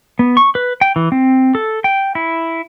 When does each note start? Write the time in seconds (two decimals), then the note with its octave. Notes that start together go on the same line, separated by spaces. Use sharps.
0.19 B3
0.37 C#6
0.55 B4
0.81 G5
0.96 E3
1.12 C4
1.55 A4
1.84 G5
2.15 E4